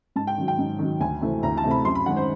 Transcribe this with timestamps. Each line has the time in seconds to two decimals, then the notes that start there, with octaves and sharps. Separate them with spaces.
0.16 G#2 A5
0.27 G5
0.38 D#3 F#3
0.48 G5
0.59 G#2
0.79 D#3 F#3
1.00 D2 G#5
1.21 C3 E3 A3 C4
1.43 D2 A#5
1.57 A5
1.64 C3 E3 A3 C4
1.71 B5
1.85 F#2 C6
1.95 B5
2.06 D#3 G#3 C#4 F#5
2.17 C5